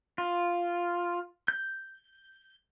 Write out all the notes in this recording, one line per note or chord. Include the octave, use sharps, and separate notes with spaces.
F4
G6